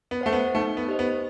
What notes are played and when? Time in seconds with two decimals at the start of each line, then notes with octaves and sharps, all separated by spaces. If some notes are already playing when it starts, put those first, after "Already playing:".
0.11 B3
0.21 A3 C5 F#5
0.33 B3
0.55 A3 D#4
0.77 B3
0.88 G4 C5 D#5
0.99 B3